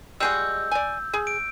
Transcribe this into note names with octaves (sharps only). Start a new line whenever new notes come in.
G3 G#3 F#4 E6 G6
D5 G#5
G#4
D7